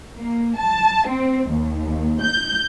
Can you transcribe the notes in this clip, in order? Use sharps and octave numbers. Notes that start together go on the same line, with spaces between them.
A#3
A5
C4
D#2
G6